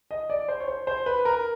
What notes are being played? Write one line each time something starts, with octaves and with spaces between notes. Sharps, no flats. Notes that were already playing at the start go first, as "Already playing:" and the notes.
D#5
D5
C5
C#5
C5
C5
B4
A#4